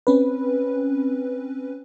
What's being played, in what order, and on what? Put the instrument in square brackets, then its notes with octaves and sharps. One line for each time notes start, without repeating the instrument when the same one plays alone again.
[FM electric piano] C4 C#4 B4